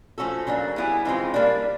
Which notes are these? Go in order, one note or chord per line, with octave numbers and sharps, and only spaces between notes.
F3 A3 C#4 F#4 A4
C#3 F#3 A#3 D4
G3 B3 E4 G#4
C#3 E3 G#3 C4 F4
G3 A#3 D4